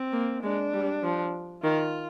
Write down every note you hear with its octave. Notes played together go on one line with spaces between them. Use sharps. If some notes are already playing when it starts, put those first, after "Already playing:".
Already playing: C4
A#3
G#3 D4
G3
F3
D#3 F4